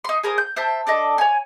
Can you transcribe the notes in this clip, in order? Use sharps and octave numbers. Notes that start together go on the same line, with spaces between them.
D#4 C6
G#4 A#4 C5 D#6
G6
C5 E5 G5 A5
D4 A4 D5 D#5
C#5 G#5